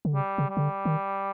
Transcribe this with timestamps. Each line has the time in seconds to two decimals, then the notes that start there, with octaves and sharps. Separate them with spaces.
0.05 D3
0.14 C#3 G3
0.38 C#3
0.49 G3
0.57 C#3
0.61 D3
0.85 D#3